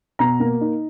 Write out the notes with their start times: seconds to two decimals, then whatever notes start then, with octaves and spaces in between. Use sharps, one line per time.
0.19 B2 A#5
0.40 A#3
0.61 D#4